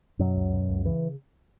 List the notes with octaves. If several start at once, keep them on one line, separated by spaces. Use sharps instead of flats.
F#2 B2 F#3
C#2
B2
C#2
C#3 E3